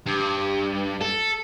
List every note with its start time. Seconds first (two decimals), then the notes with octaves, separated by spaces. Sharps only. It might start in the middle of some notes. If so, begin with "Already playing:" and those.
0.07 G2
1.02 A4